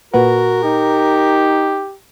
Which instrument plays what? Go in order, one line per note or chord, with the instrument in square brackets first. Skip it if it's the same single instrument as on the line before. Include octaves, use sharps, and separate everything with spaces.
[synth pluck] A#2 B4 F#5 [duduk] F#4 [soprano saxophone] A#4
[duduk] D#4 [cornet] G4